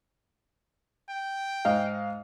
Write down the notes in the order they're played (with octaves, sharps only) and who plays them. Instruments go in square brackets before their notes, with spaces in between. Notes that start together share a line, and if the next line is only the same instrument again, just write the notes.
[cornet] G5
[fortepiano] G#2 D#5 F5